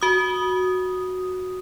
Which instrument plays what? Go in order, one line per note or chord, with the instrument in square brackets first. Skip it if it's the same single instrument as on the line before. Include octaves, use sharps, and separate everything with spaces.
[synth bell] F#4 D#6